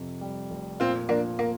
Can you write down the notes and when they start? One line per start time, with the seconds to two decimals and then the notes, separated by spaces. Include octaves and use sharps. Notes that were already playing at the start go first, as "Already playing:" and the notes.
Already playing: F2 C3
0.21 G3
0.51 F1
0.80 A#2 C4 F4
1.09 F3 A#3 D4
1.39 A#3